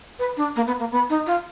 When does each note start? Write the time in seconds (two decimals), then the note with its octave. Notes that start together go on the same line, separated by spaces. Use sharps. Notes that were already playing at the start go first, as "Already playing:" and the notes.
0.19 B4
0.37 D4
0.56 A#3
0.67 B3
0.80 A#3
0.92 B3
1.10 D#4
1.27 F4